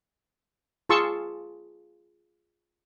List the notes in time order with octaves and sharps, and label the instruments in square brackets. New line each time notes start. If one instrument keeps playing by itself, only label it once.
[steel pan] F4 G#4 A5 C6 C#6 E6